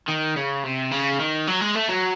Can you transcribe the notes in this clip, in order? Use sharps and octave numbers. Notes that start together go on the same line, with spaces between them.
D#3
C#3
C3
C#3
D#3
F#3
G#3
A3
F#3